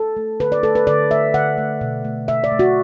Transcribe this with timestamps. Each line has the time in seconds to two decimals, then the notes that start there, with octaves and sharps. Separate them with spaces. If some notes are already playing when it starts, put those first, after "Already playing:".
Already playing: A4
0.17 A3
0.40 D3 B4
0.52 D5
0.63 A3 A4
0.75 B4
0.87 D3 D5
1.11 A3 E5
1.34 D3 F#5
1.58 A3
1.81 B2
2.05 A3
2.28 B2 E5
2.44 D5
2.52 A3
2.59 F#4